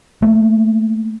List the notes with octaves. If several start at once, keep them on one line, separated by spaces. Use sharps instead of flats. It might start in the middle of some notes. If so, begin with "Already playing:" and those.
A3 A#3